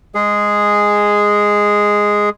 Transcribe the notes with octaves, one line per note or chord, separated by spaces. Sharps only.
G#3 G#4